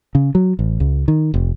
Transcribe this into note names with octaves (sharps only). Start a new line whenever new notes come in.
C#3
F#3
A1
C#2
D#3
F1